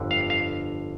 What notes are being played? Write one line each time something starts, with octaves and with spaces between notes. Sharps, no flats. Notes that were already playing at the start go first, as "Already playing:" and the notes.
Already playing: G1 F2 D3
F5
F5